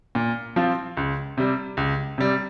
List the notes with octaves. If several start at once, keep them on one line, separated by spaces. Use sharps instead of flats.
A#2
F3 C4 F4
C#2
C3 G3
C#2
C3 G3